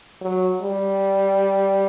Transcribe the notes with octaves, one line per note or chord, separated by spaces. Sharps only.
F#3
G3